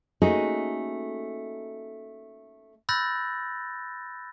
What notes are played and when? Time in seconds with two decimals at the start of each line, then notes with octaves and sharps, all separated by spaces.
0.22 A3 A#3 C#4 D#4 F#4 G#4
2.89 B5 E6 F#6 G6 A6 A#6